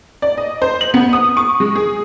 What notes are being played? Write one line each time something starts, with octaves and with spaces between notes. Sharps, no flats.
D5
D#5
C5
F#7
B3
D#6
C#6
G#3
G#4